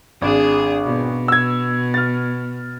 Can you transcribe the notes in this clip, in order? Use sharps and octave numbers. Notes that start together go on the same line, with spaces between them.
G#1 D4 G#4
B2
E6 G#6
F6 A6